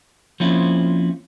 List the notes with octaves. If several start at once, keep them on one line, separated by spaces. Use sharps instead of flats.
F3 A#3 C4 C#4 E4 F4